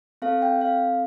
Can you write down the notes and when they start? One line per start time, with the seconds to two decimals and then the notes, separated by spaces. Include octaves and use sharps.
0.22 C4 A4 F5
0.42 G5
0.61 F5